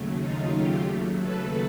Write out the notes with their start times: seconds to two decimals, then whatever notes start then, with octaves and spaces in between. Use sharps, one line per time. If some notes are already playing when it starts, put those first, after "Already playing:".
Already playing: D#2 C#3 F#3 A3
0.21 D#4 F4
0.55 F4 G4
1.22 A4 B4